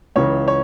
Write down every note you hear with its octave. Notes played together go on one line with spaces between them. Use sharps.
C#2 C#3 E3 C#5
C#5